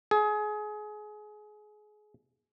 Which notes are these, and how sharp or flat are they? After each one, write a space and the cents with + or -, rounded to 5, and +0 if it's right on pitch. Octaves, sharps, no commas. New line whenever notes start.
G#4 +25